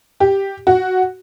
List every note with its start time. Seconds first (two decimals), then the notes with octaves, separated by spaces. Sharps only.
0.20 G4
0.67 F#4